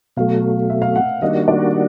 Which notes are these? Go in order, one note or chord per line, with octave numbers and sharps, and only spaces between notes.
B2 F#3 A3 F5
E5
F5
F#5
D#3 G3 A#3 D4 F#4 D#5
D5